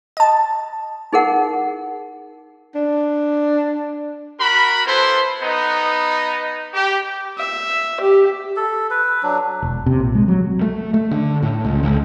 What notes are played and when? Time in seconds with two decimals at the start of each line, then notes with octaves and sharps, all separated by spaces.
0.17 D#5 A5
1.13 D#4 G#4 A#4 F#5
2.75 D4
4.39 F#4 A#4 B5
4.85 B3 E4 A4 C5
5.42 B3 D#4
6.73 G4
7.38 E5
8.01 G4
8.56 A4
8.91 B4
9.23 F#3 D4
9.62 E1
9.86 C3
10.00 A#1
10.15 G#3
10.28 F#3
10.62 A3
10.94 A3
11.11 D3
11.43 A2
11.64 C#2
11.83 C#2